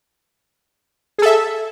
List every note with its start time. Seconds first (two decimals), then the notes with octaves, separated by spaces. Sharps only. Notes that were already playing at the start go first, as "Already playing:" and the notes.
1.18 G#4
1.22 A4
1.26 E5